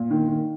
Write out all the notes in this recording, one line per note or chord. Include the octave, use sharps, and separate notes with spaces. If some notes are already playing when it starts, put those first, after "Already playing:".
Already playing: A#2
D#3
D#3